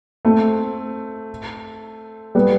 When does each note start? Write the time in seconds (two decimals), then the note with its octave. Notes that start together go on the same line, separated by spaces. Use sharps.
0.25 A3 C4
2.35 G3 B3